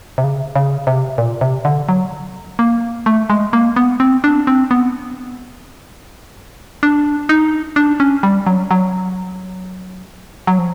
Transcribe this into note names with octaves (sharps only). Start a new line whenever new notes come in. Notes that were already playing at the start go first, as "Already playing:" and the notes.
C3
C#3
C#3
C3
A#2
C3
D3
F#3
A#3
A3
G#3
A#3
B3
C4
D4
C4
B3
D4
D#4
D4
C#4
G3
F#3
F#3
F#3
F3